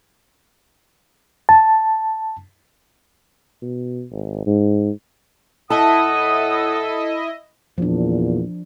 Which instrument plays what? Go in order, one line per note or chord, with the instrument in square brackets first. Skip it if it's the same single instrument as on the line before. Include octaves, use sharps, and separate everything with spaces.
[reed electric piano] A5
[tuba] B2
G#1
G#2
[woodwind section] A2 F#5 D#6 [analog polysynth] E4 D#5 E5 [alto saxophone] A4 [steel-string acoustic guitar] A5
[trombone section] E2 A#2 [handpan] F3 D4